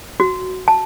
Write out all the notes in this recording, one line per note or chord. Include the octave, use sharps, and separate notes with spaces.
F#4
A5